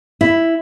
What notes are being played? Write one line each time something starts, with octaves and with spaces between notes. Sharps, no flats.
E4